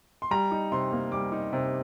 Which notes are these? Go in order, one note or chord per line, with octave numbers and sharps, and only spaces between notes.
C6
G3 A#5
D#4
C3 C6
A#3
G3 D6
D#4
C3